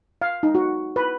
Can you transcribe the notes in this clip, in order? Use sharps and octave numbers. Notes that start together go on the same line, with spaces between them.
F5
D#4
F#4
B4